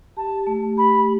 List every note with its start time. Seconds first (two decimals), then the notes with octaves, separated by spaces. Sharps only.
0.17 G4 A5
0.47 A3
0.77 G4 B5